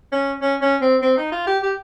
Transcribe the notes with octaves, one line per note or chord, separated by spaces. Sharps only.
C#4
C#4
C#4
C4
C4
D#4
F4
G4
G4